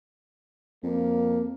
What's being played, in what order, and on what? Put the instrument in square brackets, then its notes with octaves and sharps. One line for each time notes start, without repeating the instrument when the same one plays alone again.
[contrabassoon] F2 [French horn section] A#3